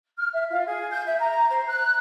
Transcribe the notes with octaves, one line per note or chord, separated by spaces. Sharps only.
F6
E5
F4
G#4
G6
E5
A#5
C5
F#6